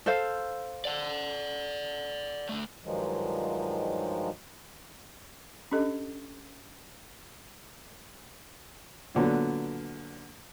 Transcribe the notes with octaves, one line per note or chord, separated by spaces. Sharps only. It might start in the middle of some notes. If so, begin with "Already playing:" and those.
A4 C5 F5
D5 F#5
D3 A3
G2 D#3 F3 F#3 G#3
C#4 D4 G4 A4 D#5
A#2 D3 F#3 B3